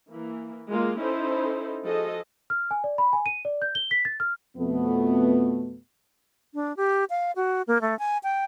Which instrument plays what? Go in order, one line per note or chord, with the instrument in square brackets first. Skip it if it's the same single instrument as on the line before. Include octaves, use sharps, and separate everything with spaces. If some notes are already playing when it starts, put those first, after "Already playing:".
[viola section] E3 A#3
G#3 A#3 F4
C#4 D#4 E4 A4 C5
F3 F#4 G#4 A4 D#5
[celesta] F6
G#5
D5
B5
G#5
D#7
D5
G6
G7
B6
A6
F6
[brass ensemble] F2 B2 A3 B3
[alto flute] D4
G4
F5
F#4
A#3
A3
G#5
G5